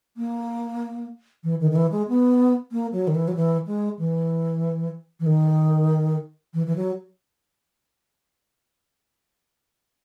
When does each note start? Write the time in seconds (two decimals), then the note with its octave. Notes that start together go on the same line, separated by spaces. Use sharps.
0.17 A#3
1.43 E3
1.61 D#3
1.71 D#3
1.75 E3
1.91 G#3
2.08 B3
2.72 A#3
2.92 F#3
3.07 D#3
3.15 E3
3.28 F#3
3.35 E3
3.67 G#3
3.99 E3
5.20 E3
5.26 D#3
6.54 E3
6.66 E3
6.76 F#3